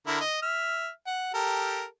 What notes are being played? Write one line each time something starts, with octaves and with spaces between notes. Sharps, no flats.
D3 E4 A#4
D#5
E5 F6
F#5
G4 A4 A#4